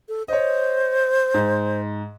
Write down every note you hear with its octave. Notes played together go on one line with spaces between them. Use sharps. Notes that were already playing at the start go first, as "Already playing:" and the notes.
A4
C5 C#5 D#5
G#2